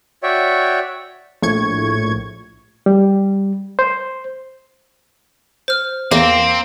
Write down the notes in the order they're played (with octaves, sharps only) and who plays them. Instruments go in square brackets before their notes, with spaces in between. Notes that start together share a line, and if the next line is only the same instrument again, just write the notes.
[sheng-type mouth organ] F#4 C#5 D5 E5 G5
[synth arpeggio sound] A#1 A2 C#6 G#6
[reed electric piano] G3
C5
[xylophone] C5 F6
[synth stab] E2 [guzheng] A#3 [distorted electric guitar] C4